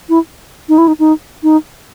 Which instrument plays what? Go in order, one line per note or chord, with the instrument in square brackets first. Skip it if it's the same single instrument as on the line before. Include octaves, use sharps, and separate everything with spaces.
[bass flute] E4
D#4
E4
D#4
D#4
D#4